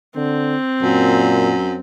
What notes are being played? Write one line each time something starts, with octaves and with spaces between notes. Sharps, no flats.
D3 C4
F#2 A#2